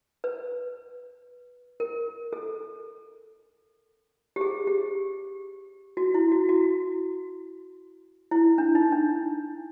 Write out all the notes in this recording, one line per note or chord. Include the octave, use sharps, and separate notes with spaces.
B4
A#4
A4
G4
G#4
G4
F#4
E4
F#4
F#4
E4
D4
D#4
D4